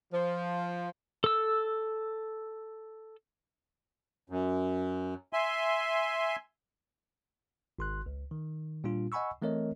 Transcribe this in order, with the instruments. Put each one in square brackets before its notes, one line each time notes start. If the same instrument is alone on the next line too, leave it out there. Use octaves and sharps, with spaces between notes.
[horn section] F3
[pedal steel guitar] A4 E6
[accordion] F#2
E5 G#5 C6
[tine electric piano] G#1 C6 F#6
C#2
D#3
A#2 G3 D4 F4
D#5 F#5 G#5 B5 C#6 E6
E3 A3 C4 A#4 C#5 D#5